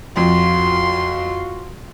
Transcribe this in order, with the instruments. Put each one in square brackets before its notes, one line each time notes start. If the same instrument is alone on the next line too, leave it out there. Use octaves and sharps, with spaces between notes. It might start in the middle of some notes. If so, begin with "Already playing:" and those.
[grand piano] F2 [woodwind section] F4 F#4 F5 [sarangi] C6